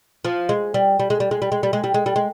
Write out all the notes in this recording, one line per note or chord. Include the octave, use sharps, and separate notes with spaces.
F3
G#3
G3
G3
G#3
G3
G#3
G3
G#3
G3
G#3
G3
G#3
G3
G#3